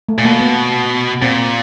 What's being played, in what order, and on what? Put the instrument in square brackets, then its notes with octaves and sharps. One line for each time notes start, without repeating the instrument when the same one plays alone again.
[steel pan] A3
[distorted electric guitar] A#2
[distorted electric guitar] B2 [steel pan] A#3
[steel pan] B3
[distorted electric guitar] A#2 [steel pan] C4